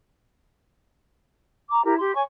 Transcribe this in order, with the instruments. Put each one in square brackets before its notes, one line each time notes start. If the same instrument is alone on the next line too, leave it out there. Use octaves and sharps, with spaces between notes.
[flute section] A#5 D6
E4 G4 A#4
G4 C6
C#5 G#5 C#6